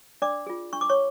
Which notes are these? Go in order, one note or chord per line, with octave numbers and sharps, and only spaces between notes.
D4 D5 D6
F4 G#4
D4 C#6
D6
C#5 C#6